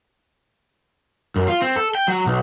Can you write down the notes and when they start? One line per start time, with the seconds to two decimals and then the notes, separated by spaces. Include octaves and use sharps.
1.36 F#2
1.48 F4
1.62 C4
1.76 A4
1.95 G5
2.08 F#3
2.26 B1